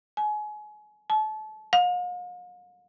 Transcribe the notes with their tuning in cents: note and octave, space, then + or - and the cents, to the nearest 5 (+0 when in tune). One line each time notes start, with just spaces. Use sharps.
G#5 +30
A5 -30
F5 +45